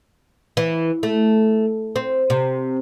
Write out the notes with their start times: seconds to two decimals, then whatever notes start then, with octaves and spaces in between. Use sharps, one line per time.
0.57 E3
1.03 A3
1.96 C4
2.30 C3